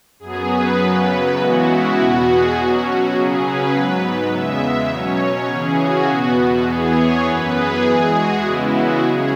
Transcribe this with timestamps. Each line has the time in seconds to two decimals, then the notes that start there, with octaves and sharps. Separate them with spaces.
0.19 F#2 F#3 B3 G#4
0.50 B4
0.79 F#2 C#3 F#3 B3
1.37 C#3 E3 G#3 B3 F#4
1.66 E4
1.96 E2 B2 B3 F#4
2.25 G#4
2.54 B2 F#3 C#4 F#4
2.84 F#4
3.13 C#3 F#3 C#4 G#4
3.42 B4
3.72 G#2 F#3 B3
4.01 B4
4.30 E2 C#3 G#3 B3 E5
4.60 E5
4.89 B2 F#3 C#4 C#5
5.48 C#3 E3 C#4 G#4
5.77 F#4
6.07 E2 B2 B3
6.36 F#4
6.66 E2 E3 B3 G#4
6.95 C#5
7.24 F#2 E3 B3 B4
7.54 G#4
7.83 E2 E3 G#3
8.13 F#4
8.42 C#3 E3 G#3 B3 E4
8.71 F#4
9.00 C#3 F#3 C#4 G#4